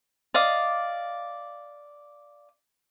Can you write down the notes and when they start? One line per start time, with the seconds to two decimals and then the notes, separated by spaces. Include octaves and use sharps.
0.34 D5 D#5 F5